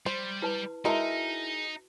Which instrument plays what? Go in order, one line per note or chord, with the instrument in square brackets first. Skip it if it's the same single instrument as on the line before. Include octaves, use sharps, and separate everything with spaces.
[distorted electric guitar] G3 [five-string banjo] C5
[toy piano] E4 B4 A5
[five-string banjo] G#3 A#4 [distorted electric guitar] D#4 [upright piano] E4 E5 [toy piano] F#4 A5